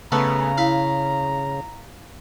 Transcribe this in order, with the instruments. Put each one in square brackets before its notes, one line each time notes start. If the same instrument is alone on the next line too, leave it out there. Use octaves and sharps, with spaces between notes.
[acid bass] C#3 [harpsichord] A3 B3 F#5 [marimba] A5 [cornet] A#5
[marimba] E4 [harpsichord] F5 B5